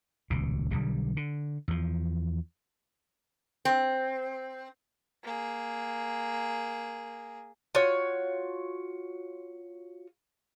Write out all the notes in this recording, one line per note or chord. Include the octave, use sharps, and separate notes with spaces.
D#1 C#2 B2
B1 D3 G3
D3
E2 F3
C4
A#3 G#4
F4 F#4 C#5